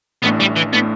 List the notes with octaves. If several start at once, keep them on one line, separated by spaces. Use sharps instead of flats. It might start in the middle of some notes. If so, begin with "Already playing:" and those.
A1 A2 A3 B3 D4
G3
E3
A2 A3 B3 D4